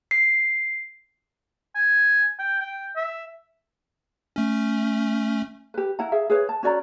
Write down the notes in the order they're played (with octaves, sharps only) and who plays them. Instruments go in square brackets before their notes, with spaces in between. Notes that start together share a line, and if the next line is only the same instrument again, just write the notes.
[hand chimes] C7
[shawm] G#5
G5
G5
E5
[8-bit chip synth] A3 C#4
[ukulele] G4 B4
E4 F#5 A#5
G#4 E5
G#4 B4 C#5
A5
C#4 F#4 D5 A#5